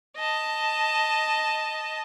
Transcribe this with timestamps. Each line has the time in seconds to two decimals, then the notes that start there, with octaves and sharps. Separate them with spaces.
0.17 D#5 A5